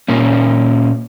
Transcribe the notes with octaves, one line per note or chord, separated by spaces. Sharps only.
A#2 A#3 C#4